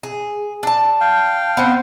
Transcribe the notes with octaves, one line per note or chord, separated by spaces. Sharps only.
G#4
D4 A5
F5 G5
B3 C4